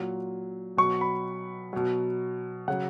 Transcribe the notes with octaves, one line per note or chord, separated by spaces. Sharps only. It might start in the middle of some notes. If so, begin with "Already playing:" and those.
Already playing: A#2 F#3
B2 F#3 C#6
B5
B2 F#3
C#3 F#3 F#5